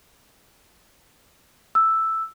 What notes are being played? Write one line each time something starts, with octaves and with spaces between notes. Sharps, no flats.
E6